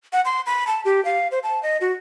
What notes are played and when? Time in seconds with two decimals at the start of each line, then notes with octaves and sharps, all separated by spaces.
0.13 F#5
0.25 C6
0.46 B5
0.67 A5
0.85 G4
1.05 F5
1.31 C5
1.43 A5
1.63 D#5
1.81 F#4